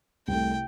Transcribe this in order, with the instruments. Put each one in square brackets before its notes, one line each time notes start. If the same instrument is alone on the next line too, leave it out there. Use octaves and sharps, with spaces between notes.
[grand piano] C2 C3 A3 [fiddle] G5